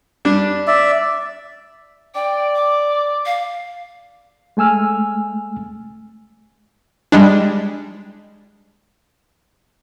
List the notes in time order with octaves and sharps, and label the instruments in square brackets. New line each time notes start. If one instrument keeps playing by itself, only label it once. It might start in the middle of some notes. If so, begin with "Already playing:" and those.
[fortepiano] G3 D4
[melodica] D5 E5
[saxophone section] D5 [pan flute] G5
[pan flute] D6
F5
[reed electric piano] G#3 A3 G#5 E6 F6
[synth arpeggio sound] G3 G#3 D4